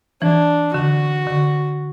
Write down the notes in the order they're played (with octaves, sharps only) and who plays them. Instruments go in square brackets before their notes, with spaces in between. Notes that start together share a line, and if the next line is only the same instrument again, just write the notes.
[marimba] E3 [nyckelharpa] D4
[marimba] D3 [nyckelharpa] F#4
[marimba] D3